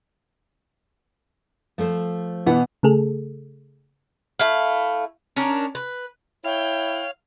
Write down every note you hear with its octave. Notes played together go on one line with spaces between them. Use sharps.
F3 A3 C5
B2 E3 B3 F#5
C#3 A3 G#4 A4
A3 E4 F5
C#4 D4 A#4
B4
E4 C#5 F5 G5